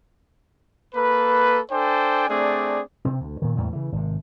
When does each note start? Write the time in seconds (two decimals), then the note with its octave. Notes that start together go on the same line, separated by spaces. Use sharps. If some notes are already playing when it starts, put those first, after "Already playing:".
0.95 A#3 A4 B4
1.71 D4 A4 C5 G5 G#5
2.29 A3 C4 D4 G#4 D5
3.05 C3 C4
3.20 D2
3.42 A#2 D#3
3.57 E2 A2 G3
3.73 C#3 E3
3.92 G#1 C3